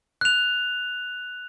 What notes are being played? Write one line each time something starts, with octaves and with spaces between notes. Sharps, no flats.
F#6 F7